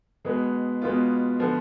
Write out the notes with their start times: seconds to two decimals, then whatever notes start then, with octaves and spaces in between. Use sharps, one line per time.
0.25 B2 G#3 B3
0.82 B2 G#3 B3 F4
1.39 D3 F3 B3